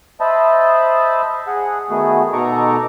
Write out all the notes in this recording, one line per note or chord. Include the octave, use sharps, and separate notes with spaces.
C5 D#5 E5 A5 B5
G#4 F#5
D#3 A3 B3 F#4 G#4
B2 D#4 A4 A#5 C#6 D6